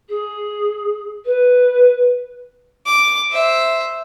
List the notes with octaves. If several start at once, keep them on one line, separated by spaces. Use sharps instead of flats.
G#4
B4
D6
C5 E5